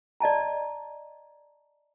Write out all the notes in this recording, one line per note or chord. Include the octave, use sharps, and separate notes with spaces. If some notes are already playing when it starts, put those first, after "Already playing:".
D5 D#5 A5 A#5